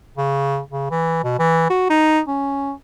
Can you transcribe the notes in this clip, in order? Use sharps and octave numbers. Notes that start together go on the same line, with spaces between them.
C#3
C#3
E3
B2
E3
F#4
D#4
C#4